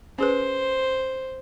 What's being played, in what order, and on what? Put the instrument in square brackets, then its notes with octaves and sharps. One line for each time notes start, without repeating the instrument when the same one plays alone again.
[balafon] C#4 G#4 B4 [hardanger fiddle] C5